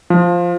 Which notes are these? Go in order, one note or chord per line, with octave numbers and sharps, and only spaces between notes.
F3